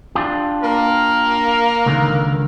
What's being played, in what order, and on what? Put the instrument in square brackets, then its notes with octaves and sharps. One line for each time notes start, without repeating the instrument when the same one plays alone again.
[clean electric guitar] D4 F4 G4
[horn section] A#3 A#4
[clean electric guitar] C#2 D3 D#3